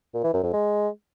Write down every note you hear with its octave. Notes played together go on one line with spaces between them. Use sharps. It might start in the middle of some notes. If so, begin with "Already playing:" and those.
A#2
E3
F#2
F2
G#3